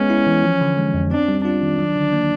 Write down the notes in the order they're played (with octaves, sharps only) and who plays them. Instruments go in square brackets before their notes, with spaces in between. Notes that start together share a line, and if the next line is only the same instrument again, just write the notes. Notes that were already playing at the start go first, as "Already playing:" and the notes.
Already playing: [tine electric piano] G#3 B3 [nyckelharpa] C#4
[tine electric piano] E4
E3
F3
D3
G#3
F2
[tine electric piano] C4 [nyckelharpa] D4
[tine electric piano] G3
[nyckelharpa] D4 [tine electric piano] F4
[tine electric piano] D#3
F#3
D3
A#3